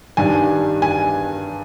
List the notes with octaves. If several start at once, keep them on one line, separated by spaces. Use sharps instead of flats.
G2 D#3 G3 D4 G#5
G#5